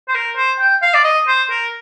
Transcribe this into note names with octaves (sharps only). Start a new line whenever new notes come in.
C5
A#4
C5
G5
F5
D5
D#5
C5
A#4